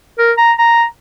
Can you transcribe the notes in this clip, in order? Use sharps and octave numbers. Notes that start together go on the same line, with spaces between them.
A#4
A#5
A#5